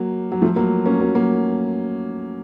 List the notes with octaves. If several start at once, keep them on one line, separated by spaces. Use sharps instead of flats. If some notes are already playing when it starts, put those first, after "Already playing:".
Already playing: F#3 A#3
F#3
F3 A3
F#3 A#3
A#3 C#4
F#3 A#3
F#3 A#3